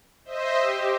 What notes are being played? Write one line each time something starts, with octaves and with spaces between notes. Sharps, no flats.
C5 D#5 E5
G4